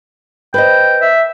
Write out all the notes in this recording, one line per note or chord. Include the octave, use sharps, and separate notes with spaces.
B4 C5 D#5 G5
E5